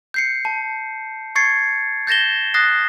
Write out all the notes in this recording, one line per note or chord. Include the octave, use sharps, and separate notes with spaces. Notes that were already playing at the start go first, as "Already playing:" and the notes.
G6 C7 C#7
A5
C#6 G#6 A6 C7 C#7
G6 A6 A#6 E7 G7
D#6 F#6 A6 A#6 C7